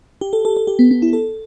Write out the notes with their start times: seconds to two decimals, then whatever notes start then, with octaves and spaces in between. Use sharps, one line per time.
0.21 G4
0.33 A4
0.45 A4
0.57 A4
0.67 G4
0.79 B3
0.91 B3
1.02 E4
1.13 A4